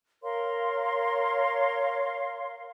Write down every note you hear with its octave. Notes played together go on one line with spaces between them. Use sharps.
A#4 C#5 F5 C6